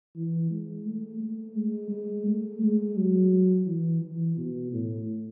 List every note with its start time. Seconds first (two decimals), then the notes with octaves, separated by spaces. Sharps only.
0.16 E3
0.51 G#3
0.86 A3
1.21 A3
1.56 G#3
1.91 G#3
2.27 A3
2.62 G#3
2.97 F#3
3.67 E3
4.02 E3
4.37 B2
4.73 A2